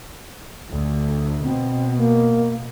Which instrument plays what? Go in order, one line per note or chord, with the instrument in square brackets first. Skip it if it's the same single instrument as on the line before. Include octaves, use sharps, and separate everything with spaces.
[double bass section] D2
[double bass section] B2 [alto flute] C4
[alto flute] A#3